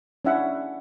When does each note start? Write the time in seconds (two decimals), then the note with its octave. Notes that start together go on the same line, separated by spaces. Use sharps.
0.25 C#4 D4 E4 E5 F#5